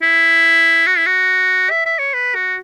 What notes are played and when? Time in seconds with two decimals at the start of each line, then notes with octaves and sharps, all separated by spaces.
0.02 E4
0.87 F#4
0.97 E4
1.06 F#4
1.71 E5
1.86 E5
1.99 C#5
2.14 B4
2.34 F#4